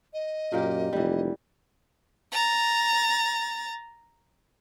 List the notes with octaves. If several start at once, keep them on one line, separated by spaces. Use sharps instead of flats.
D#5
F#2 A#2 A#3 G4
F1 E3 G3
A#5 A6